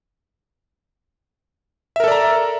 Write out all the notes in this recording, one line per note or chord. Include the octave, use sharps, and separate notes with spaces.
A4 A#4 D5 E5 A#5